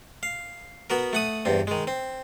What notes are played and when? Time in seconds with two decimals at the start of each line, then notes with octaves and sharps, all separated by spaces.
0.23 F5
0.90 B3 F#4 A#4
1.13 A3 F#5 D#6
1.45 E2 G2 C4
1.67 D#3 G#3
1.87 C4